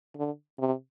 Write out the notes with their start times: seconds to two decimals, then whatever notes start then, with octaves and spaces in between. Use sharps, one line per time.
0.16 D3
0.59 C3